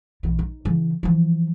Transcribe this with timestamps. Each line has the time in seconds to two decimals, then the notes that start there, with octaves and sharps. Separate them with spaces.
0.23 A#1 E3
0.39 D#4
0.65 C#3 E3
1.03 E3 F3